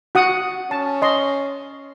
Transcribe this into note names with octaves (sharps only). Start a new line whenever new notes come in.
F#4 F#5 D#6
C#4 A5
D#5 C6